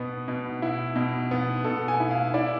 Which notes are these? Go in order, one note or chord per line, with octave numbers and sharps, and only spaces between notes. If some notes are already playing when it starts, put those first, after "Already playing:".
Already playing: B2 B3
B2
E4
B2
B3
B2 A4
G#5
E4
F5
E4 D5